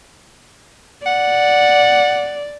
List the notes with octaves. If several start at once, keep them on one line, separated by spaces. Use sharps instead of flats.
D5 F#5